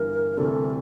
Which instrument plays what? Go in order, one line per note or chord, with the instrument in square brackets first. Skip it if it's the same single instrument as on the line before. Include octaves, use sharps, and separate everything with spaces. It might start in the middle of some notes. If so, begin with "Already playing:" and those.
Already playing: [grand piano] G1 G2 E3 [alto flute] A#4
[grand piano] D2 C3 E3 G3 C4 [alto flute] A4